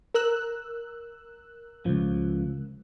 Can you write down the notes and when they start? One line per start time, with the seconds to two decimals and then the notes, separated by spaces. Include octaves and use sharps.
0.14 A#4 E6 F#6
1.86 C#2 F#2 F3